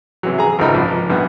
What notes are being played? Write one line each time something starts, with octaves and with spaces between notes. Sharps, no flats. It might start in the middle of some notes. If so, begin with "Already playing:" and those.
C3 E3 F#3
G#4 A#5
G#1 C#2 C3 D#4 A#4 B5
A#1
B1 G2 E3 B3